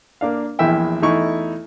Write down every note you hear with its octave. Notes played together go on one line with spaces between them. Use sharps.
A#3 D4 F5
A#1 E2 E4 E5 G5
E2 A3 D#4 E4 C#6